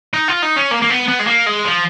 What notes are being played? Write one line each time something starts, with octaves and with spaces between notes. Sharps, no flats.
D#4
F4
D#4
C#4
A#3
A#3
B3
B3
G#3
A#3
G#3
F3